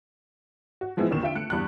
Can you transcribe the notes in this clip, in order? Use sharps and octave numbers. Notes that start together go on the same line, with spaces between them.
F#4
E3 F3 G#3 B3 C4 E4
A#1 E2 D#3 E7
D3 F4 E5 G5 D7
A3 F#6 C#7
E2 G2 F#6